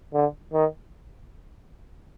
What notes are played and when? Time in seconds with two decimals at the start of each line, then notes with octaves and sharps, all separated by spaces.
0.13 D3
0.53 D#3